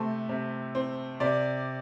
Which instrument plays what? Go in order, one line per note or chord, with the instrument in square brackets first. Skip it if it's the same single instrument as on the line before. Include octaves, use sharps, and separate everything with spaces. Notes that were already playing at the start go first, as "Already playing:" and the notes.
Already playing: [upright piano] C3 A3 C5
C3
C4
C3 D5